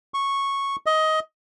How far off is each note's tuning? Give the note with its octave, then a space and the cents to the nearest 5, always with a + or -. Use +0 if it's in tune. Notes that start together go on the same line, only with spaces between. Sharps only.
C#6 -10
D#5 +15